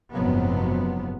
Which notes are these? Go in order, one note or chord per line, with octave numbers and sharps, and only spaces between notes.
F#1 G#2 C3 F3 F#3 B3